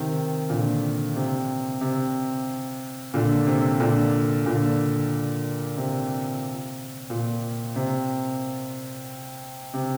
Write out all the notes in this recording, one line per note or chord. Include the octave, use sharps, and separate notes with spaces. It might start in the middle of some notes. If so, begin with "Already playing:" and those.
Already playing: C3 D#3
A#2 D3
C3
C3
A#2 D3
C3
A#2 D3
A#2 D3
C3
A#2
C3
C3